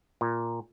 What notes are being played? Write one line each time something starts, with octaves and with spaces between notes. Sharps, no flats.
A#2